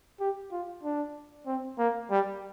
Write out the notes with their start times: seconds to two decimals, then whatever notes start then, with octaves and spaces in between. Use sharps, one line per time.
0.20 G4
0.52 F4
0.84 D4
1.47 C4
1.79 A#3
2.11 G3